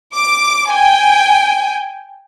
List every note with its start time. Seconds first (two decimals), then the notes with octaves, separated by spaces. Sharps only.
0.14 D6
0.71 G5 G#5